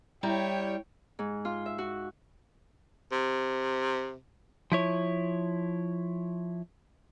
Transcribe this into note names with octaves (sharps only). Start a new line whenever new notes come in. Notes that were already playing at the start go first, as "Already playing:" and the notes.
G3 E4 C#5 G5 A#5
G#2
F4
E5
F#4
C3
F3 E4 C#5